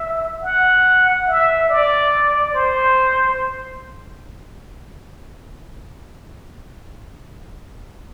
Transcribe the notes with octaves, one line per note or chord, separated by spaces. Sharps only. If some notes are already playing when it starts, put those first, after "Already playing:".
Already playing: E5
F#5
E5
D5
C5